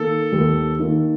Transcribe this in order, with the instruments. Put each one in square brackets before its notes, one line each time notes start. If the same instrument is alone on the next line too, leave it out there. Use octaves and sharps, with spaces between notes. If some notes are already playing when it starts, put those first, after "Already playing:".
Already playing: [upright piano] D#3 A#3 [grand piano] A4
[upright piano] D#2
D#3 A#3